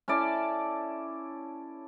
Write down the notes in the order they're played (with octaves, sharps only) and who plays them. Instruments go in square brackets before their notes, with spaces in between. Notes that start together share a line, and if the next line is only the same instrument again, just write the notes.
[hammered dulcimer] C#4 E4 A4 D5